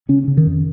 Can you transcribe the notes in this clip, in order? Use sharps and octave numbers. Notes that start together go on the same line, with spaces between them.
C#3 C#4
C#3
D#3
F2